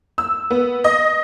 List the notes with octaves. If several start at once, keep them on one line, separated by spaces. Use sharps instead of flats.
E6
B3
D#5